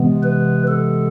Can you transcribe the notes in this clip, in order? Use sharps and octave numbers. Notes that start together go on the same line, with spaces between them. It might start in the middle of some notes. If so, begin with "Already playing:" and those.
Already playing: C3 E3 G#3 B3
B4
A4